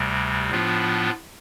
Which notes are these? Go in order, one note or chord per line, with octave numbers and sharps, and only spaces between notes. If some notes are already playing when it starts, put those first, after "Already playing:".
Already playing: D2 C3 G3
A2 F3 B3 D4 F4